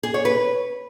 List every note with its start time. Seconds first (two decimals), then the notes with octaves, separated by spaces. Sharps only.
0.03 G#4
0.14 C#5
0.25 B4